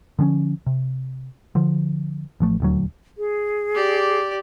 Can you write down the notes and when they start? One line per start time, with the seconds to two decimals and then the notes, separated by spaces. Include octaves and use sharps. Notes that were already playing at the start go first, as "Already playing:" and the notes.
0.19 D3 F3 B3 C#4
0.66 C3
1.55 D3 F3
2.40 A1 F3 A3
2.60 D#1 D2 F#3
3.18 G#4
3.75 G4 D5